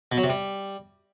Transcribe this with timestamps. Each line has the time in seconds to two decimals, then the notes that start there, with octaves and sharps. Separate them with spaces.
0.12 B2
0.18 F#3
0.24 C3
0.30 G3